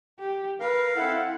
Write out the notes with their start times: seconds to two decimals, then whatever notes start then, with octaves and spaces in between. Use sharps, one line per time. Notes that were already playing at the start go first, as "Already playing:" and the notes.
0.19 G4
0.60 A#4 B4 F5
0.96 C4 E4 A4 F#5